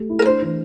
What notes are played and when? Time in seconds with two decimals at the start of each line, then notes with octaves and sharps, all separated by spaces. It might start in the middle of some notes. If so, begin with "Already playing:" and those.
Already playing: A3 G4
0.09 E4
0.19 A#4
0.26 D4 C5
0.42 E3